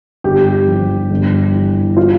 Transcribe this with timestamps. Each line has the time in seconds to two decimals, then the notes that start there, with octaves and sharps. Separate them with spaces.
0.24 G1 G4
0.67 F3
1.10 G1
1.54 E3
1.97 F4